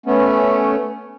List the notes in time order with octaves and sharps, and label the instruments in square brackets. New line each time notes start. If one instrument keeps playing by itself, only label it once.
[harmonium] A3 B3 C#4